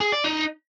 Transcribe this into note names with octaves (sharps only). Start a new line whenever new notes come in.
G#4
D5
D#4